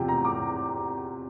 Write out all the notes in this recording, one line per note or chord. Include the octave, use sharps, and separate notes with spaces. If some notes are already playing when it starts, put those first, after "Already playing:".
Already playing: E2 C3 F3 G5
A#5
D6